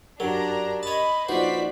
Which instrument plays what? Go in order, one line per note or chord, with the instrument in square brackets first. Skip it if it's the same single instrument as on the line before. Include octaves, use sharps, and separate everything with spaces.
[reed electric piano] F#2 G4 A#4 [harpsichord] F#3 [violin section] D4 A#5
[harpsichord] C#5 A5 [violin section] D#5 B5
[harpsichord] A#1 F#4 [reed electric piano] D#4 F4 B4 [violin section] C5 D5 B6